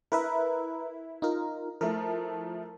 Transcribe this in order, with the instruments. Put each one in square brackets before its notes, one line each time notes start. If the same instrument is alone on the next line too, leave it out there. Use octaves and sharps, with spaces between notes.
[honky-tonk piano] E4 [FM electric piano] A#4 B4 E5
[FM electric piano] D#4 F4 A#4
[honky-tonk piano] F3 A3 E4 [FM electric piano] A#4